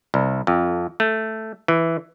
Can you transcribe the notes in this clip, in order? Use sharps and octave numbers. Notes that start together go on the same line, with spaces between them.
C2
F2
A3
E3